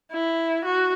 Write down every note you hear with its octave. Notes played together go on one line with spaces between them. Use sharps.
E4
F#4